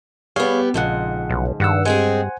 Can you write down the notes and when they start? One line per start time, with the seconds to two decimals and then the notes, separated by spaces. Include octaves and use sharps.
0.36 G3 B3 G#4 C#5 F5
0.74 A#1 F2 G#2 C#3 F4 F#5
1.30 B1
1.60 G2 D#3 F#5 E6
1.85 G#3 C4 G#4 C5 F#5 G#5